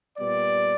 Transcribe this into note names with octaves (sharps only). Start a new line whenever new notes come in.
A#2 G3 B3 D5